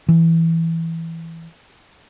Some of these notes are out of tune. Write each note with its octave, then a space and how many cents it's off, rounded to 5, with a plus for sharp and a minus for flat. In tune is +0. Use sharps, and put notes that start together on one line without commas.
E3 +0